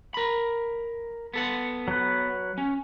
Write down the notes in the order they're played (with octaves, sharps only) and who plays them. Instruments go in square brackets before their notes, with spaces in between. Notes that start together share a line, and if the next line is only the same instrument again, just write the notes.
[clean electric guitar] A#4 B5
B3 A4 F#5
[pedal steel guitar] F#3 B4
[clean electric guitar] C#4